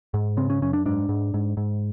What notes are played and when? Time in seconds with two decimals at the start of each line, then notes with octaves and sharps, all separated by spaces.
0.14 G#2
0.37 C#3 C4
0.50 C#4
0.62 F#2 C#4
0.73 D4
0.86 G#2 D4
1.09 G#2
1.34 G#2
1.57 G#2